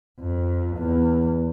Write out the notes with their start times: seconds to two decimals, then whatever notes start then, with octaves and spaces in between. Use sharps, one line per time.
0.19 F2
0.76 E2